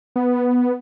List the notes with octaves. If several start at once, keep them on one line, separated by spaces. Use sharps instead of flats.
B3